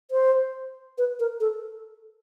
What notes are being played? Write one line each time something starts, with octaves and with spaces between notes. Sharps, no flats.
C5
B4
A#4
A4